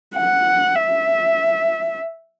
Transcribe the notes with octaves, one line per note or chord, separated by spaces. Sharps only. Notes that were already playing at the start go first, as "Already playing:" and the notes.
F#5
E5